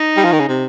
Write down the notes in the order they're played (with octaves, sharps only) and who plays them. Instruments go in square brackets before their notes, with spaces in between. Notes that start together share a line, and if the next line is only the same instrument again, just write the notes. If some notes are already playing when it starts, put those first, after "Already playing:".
Already playing: [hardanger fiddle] D#4
[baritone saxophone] G3
F3
D#3
C#3
C3